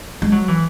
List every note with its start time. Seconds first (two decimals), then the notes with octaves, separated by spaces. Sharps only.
0.22 G#3
0.32 F#3
0.48 E3